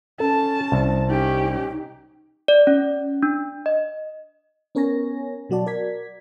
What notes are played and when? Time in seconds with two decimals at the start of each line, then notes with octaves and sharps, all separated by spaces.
0.20 C#4 A4 A5
0.72 C2
1.09 C#4 D#4 G4
1.46 D#4
2.48 D5
2.67 C#4
3.23 D4
3.66 D#5
4.75 B3 C#4 A#4 C#5 G#5 A#6
5.50 B2 F#3 F#4 D5 A5
5.66 F#4 A#4 D5 G#6 B6